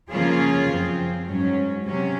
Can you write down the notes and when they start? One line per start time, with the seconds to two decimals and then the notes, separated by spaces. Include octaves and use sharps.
0.11 C#3 F3 A#3 C#4 F4 G#4
0.69 F#2 F3 C4
1.27 G#2 F#3 C#4
1.86 C3 F#3 C#4